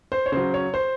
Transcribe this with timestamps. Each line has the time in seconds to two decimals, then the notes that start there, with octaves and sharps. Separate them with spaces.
0.12 C5
0.26 C#5
0.32 C#3 F#3 C5
0.54 C#5
0.74 C5